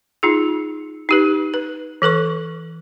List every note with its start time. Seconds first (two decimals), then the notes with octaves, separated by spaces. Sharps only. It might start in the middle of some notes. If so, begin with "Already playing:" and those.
0.23 D#4 F4 G#4
1.09 D#4 G4 B4
1.54 B4
2.02 E3 A4 B4 C#6